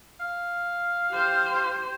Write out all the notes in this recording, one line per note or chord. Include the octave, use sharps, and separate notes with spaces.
F5
G4 C5